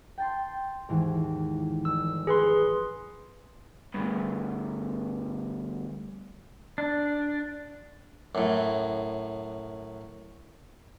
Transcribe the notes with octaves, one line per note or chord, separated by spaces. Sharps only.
G5 A5 C6
D#2 G#2 E3
F1 E6
G#4 B4 G#5 C6
D2 G2
D4
F#2 A2